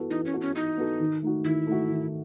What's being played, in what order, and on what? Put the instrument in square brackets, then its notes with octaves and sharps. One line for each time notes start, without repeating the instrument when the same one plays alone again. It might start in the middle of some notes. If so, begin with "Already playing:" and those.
Already playing: [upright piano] E3 B3 F#4 A4
[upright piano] E3 [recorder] D#4
[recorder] C#4
[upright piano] B3 F#4 A4
[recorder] C#4
[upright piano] E3 [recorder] D#4
[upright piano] B3 F#4 A4
D#3
A3 D#4 F#4
[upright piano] D#3 [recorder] E4
[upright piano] A3 D#4 F#4
D#3